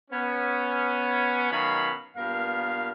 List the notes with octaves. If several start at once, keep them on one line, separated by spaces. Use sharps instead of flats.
B3 C#4
B2 D#3 F#3 C#4 F5 B5
G2 A#2 B3 A#4 F5